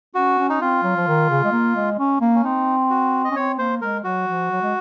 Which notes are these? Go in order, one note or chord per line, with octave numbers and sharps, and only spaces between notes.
C#4 F#4
C#4
D#4
C4 F4
F#3
F3
D#3
C#3
G#3
A#3
G#3
C#4
A#3
C#4
C4 D#4
F#4
D#5
C#4
C4 C#5
A#3 C5
G#3 A#4
F#3 F#4
F3
F#3
G#3